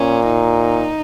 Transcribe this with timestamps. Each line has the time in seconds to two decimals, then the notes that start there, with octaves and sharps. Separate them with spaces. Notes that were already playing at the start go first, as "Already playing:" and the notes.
Already playing: A#2 C#4
0.26 D#4